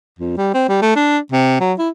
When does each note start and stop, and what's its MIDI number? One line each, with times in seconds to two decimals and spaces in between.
0.19 0.33 41
0.37 0.50 55
0.54 0.68 60
0.69 0.77 55
0.82 0.95 57
0.96 1.18 62
1.32 1.57 48
1.60 1.73 54
1.78 1.89 64